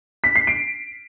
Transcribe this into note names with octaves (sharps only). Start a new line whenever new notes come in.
B6
C7
D7